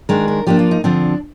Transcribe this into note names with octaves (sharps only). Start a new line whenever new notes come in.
D#3 G#3 D4 A#4
A#4
F3 A#3 D4 G4
F4
D#4
D3 F3 C4 D4